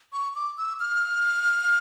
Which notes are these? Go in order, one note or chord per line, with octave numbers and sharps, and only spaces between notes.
C#6
D6
E6
F6